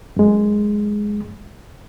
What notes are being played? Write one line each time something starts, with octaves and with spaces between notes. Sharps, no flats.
F#2 G#3